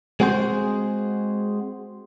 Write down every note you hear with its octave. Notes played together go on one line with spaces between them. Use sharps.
G#3 C4 F#4 G#4 C5